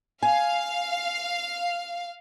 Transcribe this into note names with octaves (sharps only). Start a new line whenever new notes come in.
F5 G#5